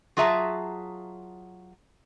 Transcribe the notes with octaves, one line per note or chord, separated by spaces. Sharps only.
F#3 F4 G#4 E5 A5 A#5